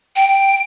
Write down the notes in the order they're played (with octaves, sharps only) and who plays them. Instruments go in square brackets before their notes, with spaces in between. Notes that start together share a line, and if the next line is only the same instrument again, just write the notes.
[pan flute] G5